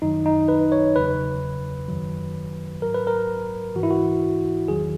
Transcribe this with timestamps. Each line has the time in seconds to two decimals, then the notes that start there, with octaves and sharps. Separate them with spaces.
0.02 F#2 D#3 F#3 D#4
0.26 D#4
0.48 B4
0.72 C#5
0.95 E2 C#3 F#3 B4
1.88 F#2 D#3 F#3
2.82 G#2 F#3 A#4
2.94 B4
3.07 A#4
3.75 G#2 E3 F#4
3.83 E4
3.90 F#4
4.68 E2 D#3 F#3 G#4